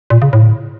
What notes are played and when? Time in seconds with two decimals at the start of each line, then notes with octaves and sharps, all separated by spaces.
0.10 A#2
0.22 C#3
0.33 A2